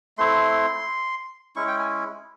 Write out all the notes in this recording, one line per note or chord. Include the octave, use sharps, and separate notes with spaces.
A3 C4 E4 C6
G#3 C#4 E4 C#6
G5
G#5